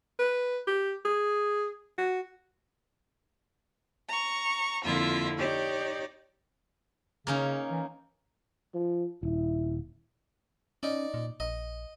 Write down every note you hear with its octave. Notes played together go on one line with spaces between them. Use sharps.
B4
G4
G#4
F#4
A#5 C#6
F2 D3 A#3 E4 F4 E5
D#4 G4 C#5 D5
C#3 A#3 C#4 D#4
E3
F3
D#1 E4
C#4 D#4 D5
A#2
A#1 D#5